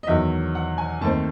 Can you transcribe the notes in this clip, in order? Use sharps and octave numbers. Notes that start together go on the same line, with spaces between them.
D#5
E2 D#3 F#3 E5
F#5
G#5
D#2 D#3 A3 C4 A5